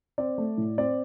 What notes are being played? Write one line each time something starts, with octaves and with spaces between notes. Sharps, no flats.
C4 D5
A3
A2
C4 D5